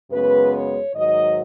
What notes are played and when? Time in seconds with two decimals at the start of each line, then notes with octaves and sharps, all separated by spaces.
0.11 F#2 C#3 G#3 B3 B4
0.53 C#5
0.95 G#2 D#3 F#3 D#5